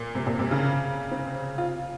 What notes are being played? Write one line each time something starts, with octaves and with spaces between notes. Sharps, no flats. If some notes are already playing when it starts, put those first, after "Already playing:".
Already playing: A#2
C3
A#2
C3
C#3
C4
F4